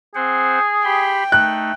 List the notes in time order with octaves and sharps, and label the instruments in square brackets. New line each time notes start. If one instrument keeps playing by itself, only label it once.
[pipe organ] C4 C5 F#5 [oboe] G#4
[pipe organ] G4 B5 C6 [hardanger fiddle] G5
[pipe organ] A3 D#4 [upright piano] F#6